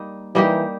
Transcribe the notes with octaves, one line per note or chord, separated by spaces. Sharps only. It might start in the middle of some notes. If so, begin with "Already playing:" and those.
Already playing: G3 A#3 D#4
E3 G3 A#3 D#4 G4